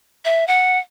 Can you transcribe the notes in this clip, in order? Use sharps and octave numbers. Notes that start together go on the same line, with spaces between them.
E5
F#5